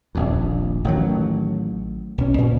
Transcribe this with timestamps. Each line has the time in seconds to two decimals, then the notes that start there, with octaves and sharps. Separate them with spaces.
0.15 D#1 A#1 F2
0.84 A1 D#3 E3 F#3
2.18 B1 C#4
2.38 A#2